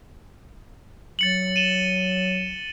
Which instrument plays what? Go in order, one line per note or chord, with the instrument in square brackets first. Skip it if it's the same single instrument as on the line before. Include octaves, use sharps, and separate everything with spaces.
[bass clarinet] F#3 [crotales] A6 C#7 F#7
[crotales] D#7 E7 G7